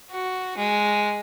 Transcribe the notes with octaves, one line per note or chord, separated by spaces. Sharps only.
F#4
G#3